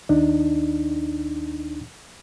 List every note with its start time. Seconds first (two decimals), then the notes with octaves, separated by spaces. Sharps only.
0.09 D#2 D4 D#4